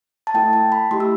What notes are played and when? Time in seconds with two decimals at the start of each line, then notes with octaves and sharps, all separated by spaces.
0.27 A5
0.34 A3 E4 A4 G5
0.53 A5
0.72 B5
0.91 A3 E4 G4 C6
1.00 E6